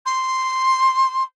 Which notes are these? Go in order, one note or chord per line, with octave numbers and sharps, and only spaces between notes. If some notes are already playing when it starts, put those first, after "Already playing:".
C6